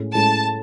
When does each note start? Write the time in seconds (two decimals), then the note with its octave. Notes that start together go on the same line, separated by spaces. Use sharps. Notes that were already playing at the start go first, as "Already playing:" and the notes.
Already playing: A2 G#3 C#4
0.15 A2 G#3 C#4 A5